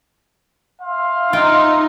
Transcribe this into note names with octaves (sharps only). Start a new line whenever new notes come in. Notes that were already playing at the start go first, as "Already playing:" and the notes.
E5 F5 C6
D#4 F4 G5